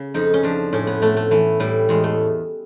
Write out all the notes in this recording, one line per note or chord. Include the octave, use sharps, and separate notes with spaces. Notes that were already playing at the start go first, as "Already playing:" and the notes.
Already playing: C#3
F2 D#4
C#4
F3 D4
A2 C#4
B3
A2 A3
A3
E3 A3
A2 G3
E2 G#3
A3